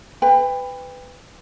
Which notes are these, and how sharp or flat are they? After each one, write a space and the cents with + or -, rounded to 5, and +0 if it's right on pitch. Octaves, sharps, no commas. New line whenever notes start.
B4 +20 G5 +30